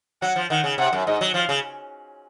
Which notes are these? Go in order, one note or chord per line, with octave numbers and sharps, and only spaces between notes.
F#3 F#5
F3
D#3 F#5
C#3
C3 F#5
F#2
G#2 D#5
F#3
F3 F5
C#3